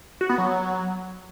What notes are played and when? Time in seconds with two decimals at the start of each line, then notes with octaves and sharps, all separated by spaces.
0.21 F#4
0.29 B3
0.38 F#3